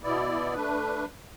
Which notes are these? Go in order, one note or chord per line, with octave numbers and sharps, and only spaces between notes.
B2 B3 E4 D5
A3 D4 B4